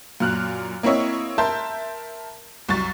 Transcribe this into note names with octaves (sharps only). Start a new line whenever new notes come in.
F#2 A#2 F6 F#6
A#3 C4 E4 C#5 D#5
A#4 E5 A5 C6 G6
C2 F#2 C#6 A6